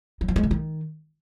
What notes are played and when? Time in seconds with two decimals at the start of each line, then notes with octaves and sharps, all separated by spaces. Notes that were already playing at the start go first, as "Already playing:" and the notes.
0.21 F#3
0.28 F3
0.36 G#3
0.43 D3
0.51 D#3